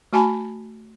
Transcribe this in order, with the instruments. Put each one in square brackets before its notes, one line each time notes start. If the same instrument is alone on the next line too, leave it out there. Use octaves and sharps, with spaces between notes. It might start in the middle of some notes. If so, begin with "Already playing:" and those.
[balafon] A3 F#4 G#5 A5 B5